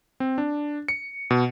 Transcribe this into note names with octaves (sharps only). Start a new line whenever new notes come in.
C4
D4
C#7
B2